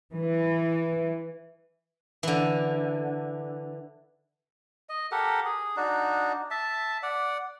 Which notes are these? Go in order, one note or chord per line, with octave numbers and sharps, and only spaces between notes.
E3
D3 E3
D#5
G4 A4 A#4 F#5
G#4
D4 D#4 F#4
E5 A5
D5 F#5